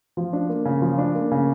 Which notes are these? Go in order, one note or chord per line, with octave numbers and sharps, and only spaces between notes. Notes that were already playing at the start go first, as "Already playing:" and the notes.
F3
D4
A#3
C#3
F3
D4
A#3
C#3